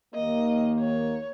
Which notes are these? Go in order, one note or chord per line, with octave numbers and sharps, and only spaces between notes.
D#2 D#3 A#3 D#5
C#5